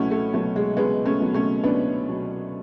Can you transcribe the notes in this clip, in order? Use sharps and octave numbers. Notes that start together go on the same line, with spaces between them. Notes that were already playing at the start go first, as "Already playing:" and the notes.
Already playing: C#2 B2 F#3 A3 C#4 E4 F#4
A3
B2 F#3 A3
G#3
C#2 G#3 B3
A3 C#4
B2 F#3
A3 C#4
C#2 B3 D4
B2 F#3